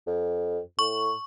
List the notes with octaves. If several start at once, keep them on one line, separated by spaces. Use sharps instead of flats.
F2
A2 C#6